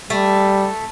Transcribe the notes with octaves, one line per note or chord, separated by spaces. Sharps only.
G3 A3